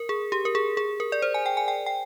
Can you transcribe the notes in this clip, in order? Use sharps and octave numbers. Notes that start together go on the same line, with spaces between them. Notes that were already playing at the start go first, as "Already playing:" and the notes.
Already playing: A#4
G#4
G4
A#4
G#4
G#4
A#4
D5
C5
G#5
G5
G#5
G5
G5